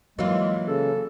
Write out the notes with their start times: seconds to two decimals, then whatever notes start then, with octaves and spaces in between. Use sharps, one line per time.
0.19 E3 F#3 G#3 A#3 F4
0.68 C#3 A4